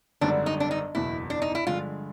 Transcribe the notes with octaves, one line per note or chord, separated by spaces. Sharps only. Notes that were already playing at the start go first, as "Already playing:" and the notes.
G#1 F#2 D3 G3 B3 D4
D#4
D4
D#4
F#1 E2 B2 E4
D4
D#4
E4
G2 D3 F3 G#3 F4